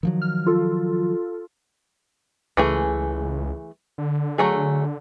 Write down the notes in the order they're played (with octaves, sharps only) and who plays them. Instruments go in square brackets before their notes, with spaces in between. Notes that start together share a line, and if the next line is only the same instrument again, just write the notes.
[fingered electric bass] D#3 F3 F#3
[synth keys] F6
F4 A4
[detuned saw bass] C#2 [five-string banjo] E3 A3 G#4
[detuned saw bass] D3
[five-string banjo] F#3 A3 G#4